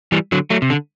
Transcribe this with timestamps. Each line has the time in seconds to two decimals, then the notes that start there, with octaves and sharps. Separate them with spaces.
0.12 E3 G3
0.32 D3 F#3
0.50 F#3 A3
0.62 C3
0.70 D3